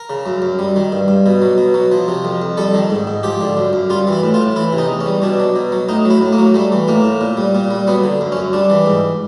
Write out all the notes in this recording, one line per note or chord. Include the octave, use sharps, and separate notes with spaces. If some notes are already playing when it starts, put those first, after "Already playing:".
Already playing: A#4
C#3
F#2
F#2
G3
D#3
G2
G2
B2
F#3
B2
F#3
F3
C3
F2
F2
G3 A4
D#3
G#2
G#2
F3 G4
D3
F#2
F#2
G3 F4
E3
E4
A2
F4
A2
E3 E4
C3
D#4
E2
C#4
G3
B2 D4
F#3
B2
F#3
A2 D#4
F#3 E4
A2
A#3
F#3
G3 A3
E3
A2 A#3
A2
A#2
G3
A#2
G3
F#3 B3
D3
F#2
C#4
F#2
G3 D4
E3
G#2